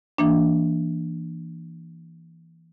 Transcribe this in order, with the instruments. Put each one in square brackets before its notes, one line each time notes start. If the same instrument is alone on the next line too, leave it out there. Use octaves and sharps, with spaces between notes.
[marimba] E3 A#3 D4